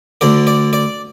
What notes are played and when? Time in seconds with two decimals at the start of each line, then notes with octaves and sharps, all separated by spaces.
0.21 D2 D3 D5
0.47 D5
0.73 D5